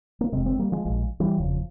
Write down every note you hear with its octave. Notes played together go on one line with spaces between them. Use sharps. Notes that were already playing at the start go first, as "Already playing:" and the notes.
A#3
F1 F2 C3 G#3 C4
G#3 C4
G3 A#3
F3 G#3
A#1 A#2 F3 G#3
E3 G3
F1 E2 C#3 F3